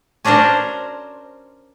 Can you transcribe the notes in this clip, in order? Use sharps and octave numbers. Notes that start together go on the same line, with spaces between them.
C#4 D4 F#4 A#4 C5